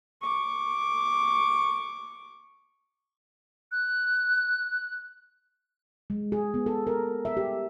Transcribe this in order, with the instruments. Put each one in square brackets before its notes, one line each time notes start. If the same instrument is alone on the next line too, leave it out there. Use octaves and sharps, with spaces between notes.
[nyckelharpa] C#6 D6
[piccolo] F#6
[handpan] G#3
G#4
B3
A4
A#4
E5
G4